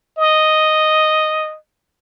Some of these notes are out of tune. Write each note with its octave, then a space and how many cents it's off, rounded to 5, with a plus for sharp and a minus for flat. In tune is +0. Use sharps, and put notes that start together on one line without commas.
D#5 +0